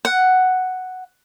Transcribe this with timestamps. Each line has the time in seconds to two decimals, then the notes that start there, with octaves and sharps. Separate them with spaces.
0.05 F#5